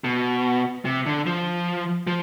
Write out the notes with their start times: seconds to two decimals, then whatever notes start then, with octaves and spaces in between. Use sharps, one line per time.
0.04 B2
0.85 C3
1.06 D3
1.26 F3
2.07 F3